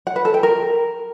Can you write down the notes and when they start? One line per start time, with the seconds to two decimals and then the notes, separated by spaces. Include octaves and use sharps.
0.07 F#5
0.16 B4
0.25 A4
0.34 G5
0.43 A#4